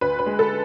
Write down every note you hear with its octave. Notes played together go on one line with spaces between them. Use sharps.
D2 B4
B4
G#3
A4